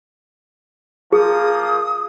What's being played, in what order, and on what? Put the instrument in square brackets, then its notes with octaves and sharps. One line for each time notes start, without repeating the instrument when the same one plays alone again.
[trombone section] F3 A#3 [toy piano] G#4 [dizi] D#6